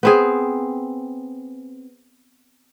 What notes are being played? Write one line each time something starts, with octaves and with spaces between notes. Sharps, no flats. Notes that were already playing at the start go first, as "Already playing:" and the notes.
B3 C4 G#4